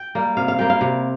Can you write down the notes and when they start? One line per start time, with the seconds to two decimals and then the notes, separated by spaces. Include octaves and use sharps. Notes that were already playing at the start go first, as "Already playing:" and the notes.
Already playing: G5
0.15 G3 A#3
0.37 C3 F5
0.48 F5
0.59 G3 A#3 G5
0.70 F5
0.81 C3